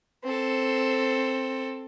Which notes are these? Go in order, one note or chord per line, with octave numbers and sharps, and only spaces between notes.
C4 A4